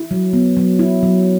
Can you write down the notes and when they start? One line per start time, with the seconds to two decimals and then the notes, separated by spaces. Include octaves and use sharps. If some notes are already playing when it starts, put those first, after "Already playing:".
Already playing: E4
0.11 F#3
0.33 B3
0.57 F#3
0.79 E4
1.03 F#3